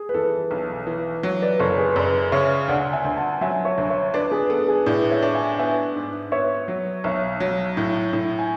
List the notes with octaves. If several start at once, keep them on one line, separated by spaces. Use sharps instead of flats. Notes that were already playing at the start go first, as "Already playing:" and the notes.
Already playing: G#4
B4
E3 A4
B1
E3
F#3
B4 D5
F#1 A4 C#5
G#4 B4
F#2 B4 D5
C#3 C#5 E5
D2 D5 F#5
E5 G#5
D2
F#5 A5
F#3 E5 G#5
C#5 E5
D2
C#5 E5
D4 B4 D5
G#4 B4
B3 A4
G#4 B4
A2 B4 D5
C#5 E5
D4
E5 G#5
B3 E5 G#5
G#2
B3 C#5 E5
F#3
B1 C#5 E5
F#3
A2
A2
G#5